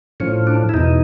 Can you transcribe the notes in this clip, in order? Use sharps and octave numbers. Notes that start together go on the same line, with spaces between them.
A2 F3 C#4
D4
E4
E2 B2 D#4